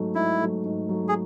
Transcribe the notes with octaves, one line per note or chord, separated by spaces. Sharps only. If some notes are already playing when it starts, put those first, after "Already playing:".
Already playing: G#2 F#3 A3
G#2 E4
F#3 A3
G#2
F#3 A3
G#4